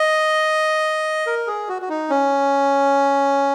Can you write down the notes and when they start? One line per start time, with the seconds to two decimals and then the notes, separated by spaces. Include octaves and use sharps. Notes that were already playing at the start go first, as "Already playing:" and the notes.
Already playing: D#5
1.27 A#4
1.47 G#4
1.69 F#4
1.82 F#4
1.89 D#4
2.10 C#4